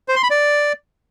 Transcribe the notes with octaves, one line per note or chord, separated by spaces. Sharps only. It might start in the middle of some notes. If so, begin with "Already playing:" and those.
C5
C6
B5
D5